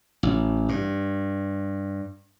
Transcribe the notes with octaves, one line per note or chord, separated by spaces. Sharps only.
A1
G2